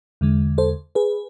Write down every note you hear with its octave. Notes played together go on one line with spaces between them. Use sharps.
E2 D3 G#3
A4 C5
G#4 B4